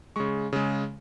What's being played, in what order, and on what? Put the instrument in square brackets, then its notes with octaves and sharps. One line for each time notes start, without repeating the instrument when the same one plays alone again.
[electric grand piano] C#3 G#3 C#6
C#3 G#3